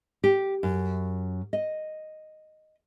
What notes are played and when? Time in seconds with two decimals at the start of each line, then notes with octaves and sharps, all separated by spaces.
0.24 G4
0.63 F#2
1.53 D#5